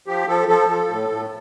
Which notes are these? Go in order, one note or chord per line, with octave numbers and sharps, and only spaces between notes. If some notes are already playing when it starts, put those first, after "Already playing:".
F3 G4
F3 A4
F3 A4
F3
A2
A2